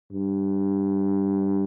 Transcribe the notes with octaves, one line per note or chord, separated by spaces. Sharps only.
G2